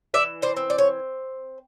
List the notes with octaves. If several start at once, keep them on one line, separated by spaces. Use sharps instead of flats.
E3 D5 E5
C5 D5
C4
D5
C#5